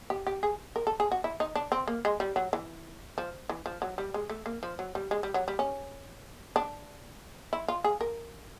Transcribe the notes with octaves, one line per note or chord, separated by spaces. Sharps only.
G4
G4
G#4
A#4
A4
G#4
F#4
E4
D#4
D4
C4
A#3
G#3
G3
F#3
E3
F3
E3
F3
F#3
G3
G#3
A3
A#3
F3
F#3
G3
G#3
G3
F#3
G3
C#4
D4
E4
F4
G#4
A#4